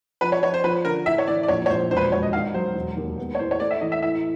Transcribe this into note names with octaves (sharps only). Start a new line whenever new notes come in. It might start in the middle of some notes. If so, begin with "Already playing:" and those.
F3 B4
C#5
F3 C#5
C5
F3 B4
D3 A#4
A2 E5
C#5
E3 D5
D5
A#1 C#5
C#5
A#1 C5
E1 C5
B4
C5
E1 C#5
D#5
D#3 F5
F#3 C5
E1
D#2
B3
C#5
A2 C5
C#5
A3 D5
E5
E3 D#5
E5
A2 E5